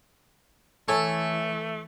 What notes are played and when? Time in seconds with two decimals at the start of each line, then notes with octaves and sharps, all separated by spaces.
0.88 E3 A3 A4 C#5 G#5